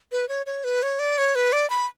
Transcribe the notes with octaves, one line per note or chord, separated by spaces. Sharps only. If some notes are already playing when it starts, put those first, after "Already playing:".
B4
C#5
C#5
B4
C#5
D5
C#5
B4
D5
B5